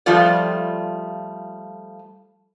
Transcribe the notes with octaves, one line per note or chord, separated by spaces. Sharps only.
F3 G3 A3 F4 D5